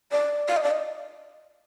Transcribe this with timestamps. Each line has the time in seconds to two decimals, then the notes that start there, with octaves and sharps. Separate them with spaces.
0.12 D5
0.48 F5
0.57 D#5
0.63 D5
0.71 D#5